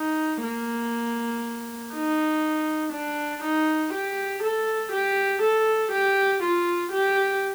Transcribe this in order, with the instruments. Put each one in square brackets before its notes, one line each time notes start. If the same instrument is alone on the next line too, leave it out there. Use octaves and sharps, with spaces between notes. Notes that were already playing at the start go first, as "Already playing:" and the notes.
Already playing: [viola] D#4
A#3
D#4
D4
D#4
G4
A4
G4
A4
G4
F4
G4